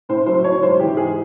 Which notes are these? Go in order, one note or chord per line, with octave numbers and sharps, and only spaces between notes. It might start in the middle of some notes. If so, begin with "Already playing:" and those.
A2 C5
F#3 C5
F#3 C#5
G#2 C5
E3 G4
G#2 G#4